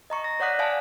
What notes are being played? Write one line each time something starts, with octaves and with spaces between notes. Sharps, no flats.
D#5 A#5 C#6
A#6
C#5 D5 F#5 D#6 F#6 B6
D5 F5 G#5 A5